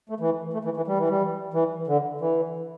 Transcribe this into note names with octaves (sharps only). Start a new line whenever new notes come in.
A3
E3
A3
E3
E3
G3
E3
G3
E3
D3
E3